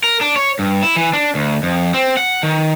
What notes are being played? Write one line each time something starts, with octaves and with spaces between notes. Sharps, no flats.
A#4
D4
C#5
G2
E4
E3
D4
D2
F2
C4
F#5
D#3